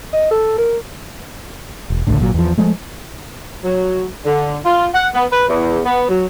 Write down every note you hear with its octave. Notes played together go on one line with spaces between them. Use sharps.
D#5
A4
A#4
E1
G#1 C#2 A2 D3
G#1 A#2 F#3
E2 F3
F3 G#3 A3
F#3
D3
F4
F#5
B3
B4
E2
B3
F#3